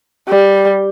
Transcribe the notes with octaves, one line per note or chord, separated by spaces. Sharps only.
G3